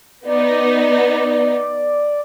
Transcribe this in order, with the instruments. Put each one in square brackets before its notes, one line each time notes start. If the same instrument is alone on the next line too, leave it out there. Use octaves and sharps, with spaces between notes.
[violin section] B3 D#4 [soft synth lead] D5